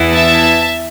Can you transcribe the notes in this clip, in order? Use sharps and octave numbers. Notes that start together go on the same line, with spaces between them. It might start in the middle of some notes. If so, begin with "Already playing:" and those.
Already playing: E2 E3 B3 E4
E5 A5